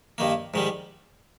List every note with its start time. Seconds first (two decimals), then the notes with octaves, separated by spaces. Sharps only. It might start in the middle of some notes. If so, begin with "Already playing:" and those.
0.18 G2 D#3 A#3
0.54 G#2 D#3 G3